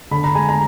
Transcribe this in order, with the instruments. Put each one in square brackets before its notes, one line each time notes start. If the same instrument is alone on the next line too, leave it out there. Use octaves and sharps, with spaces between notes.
[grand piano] D3 B5
A#5
G#3 G#5
A#5